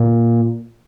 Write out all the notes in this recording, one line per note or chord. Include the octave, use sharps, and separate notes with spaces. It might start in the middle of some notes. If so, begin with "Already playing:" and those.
Already playing: A#2